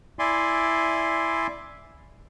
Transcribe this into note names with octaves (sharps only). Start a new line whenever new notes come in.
E4 D5 E5 G#5 C6